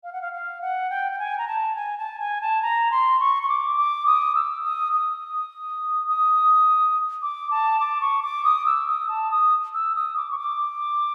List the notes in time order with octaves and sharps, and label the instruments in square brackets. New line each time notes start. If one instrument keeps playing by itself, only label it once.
[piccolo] F5
F#5
F5
F5
F#5
G5
G5
G#5
A#5
A5
G#5
A5
G#5
A5
A#5
C6
C#6
C#6
D6
D6
D#6
E6
D#6
D#6
D#6
D6
A5
D6
C#6
D6
D#6
E6
D#6
A5
D#6
E6
D#6
D6
C#6
D6